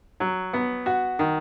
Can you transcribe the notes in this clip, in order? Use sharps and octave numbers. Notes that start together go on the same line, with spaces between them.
F#3
B3
F#4
D#3